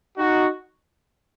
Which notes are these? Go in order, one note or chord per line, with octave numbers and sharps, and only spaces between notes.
D#4 F#4